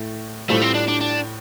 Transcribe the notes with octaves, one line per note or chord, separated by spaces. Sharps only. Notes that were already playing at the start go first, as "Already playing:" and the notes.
Already playing: A2 A3
A2 G3 A3 F4 C5
C4
D4
D4
D4